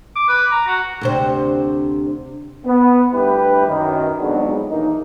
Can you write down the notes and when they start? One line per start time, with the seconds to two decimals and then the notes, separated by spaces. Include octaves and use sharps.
0.16 D6
0.29 B4
0.52 A#5
0.67 F#4
1.01 D2 C3 C5
2.65 B3
3.12 D2 G2 E4 G4 B4
3.67 F#2 D#3
4.19 F2 G#2 F#3 G#3 B3 D4
4.69 A#1 D#2 E3 A#3 D#4